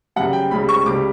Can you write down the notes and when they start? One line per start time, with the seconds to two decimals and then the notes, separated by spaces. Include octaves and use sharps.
0.16 F#2 C#3 G3 F#5
0.33 G5
0.51 C#2 C#3 G3 B5
0.69 C#6
0.86 C#2 C#3 G3 D6